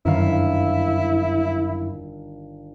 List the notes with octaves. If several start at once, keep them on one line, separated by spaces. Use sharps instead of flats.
G1 F#2 D#3 E4 F5